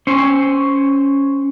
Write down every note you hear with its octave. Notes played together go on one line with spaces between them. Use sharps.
C#4 C5